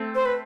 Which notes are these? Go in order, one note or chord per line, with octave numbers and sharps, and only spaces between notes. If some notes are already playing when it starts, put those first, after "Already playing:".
Already playing: A3 C4
C5
B4